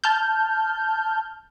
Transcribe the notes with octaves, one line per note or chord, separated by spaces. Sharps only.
A5 F6 G6